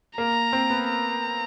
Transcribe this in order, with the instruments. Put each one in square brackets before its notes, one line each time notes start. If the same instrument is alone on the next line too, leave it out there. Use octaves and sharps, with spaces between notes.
[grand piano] A#3 [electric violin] A#5
[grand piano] C4
B3
[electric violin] A#5